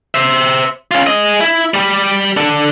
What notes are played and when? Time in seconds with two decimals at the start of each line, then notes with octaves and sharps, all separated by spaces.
0.15 C5 E5
0.91 C#4 F4
1.07 G#4 D#5
1.40 E4
1.74 G3 G4
2.37 D4 A4